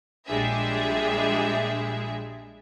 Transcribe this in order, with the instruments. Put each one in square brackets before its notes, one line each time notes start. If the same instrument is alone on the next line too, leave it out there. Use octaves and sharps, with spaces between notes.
[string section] A#1 G3 G#3 D4 G#4 E5